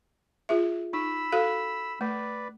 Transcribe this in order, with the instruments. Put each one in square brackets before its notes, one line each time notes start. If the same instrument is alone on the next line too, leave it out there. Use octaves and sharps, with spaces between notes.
[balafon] F4 G#4 E5
[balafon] D#4 [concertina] B5 E6
[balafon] F#4 A4 F5
[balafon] A3 [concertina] B4 D5